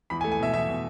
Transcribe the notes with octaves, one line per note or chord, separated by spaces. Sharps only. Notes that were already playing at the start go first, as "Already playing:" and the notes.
E2 B5
G#5
A3
G#5
B2 E5
E2 E5
B2